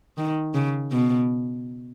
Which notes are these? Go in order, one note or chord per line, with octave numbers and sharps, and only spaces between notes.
D#3
C#3
B2